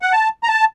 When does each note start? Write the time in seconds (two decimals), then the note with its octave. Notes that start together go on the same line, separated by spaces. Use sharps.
0.02 F#5
0.13 A5
0.43 A#5
0.48 A5